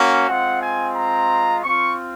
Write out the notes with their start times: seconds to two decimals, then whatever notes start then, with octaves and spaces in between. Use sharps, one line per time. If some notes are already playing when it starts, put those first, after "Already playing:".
Already playing: A#3 C#4 F#4
0.27 G#3 C4 F4 F#5
0.61 G#5
0.96 A#5
1.64 C4 F4 C#6